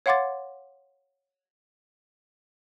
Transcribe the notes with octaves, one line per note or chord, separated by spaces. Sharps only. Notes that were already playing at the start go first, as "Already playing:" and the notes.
C#5 F5 F#5 C6 D6 A6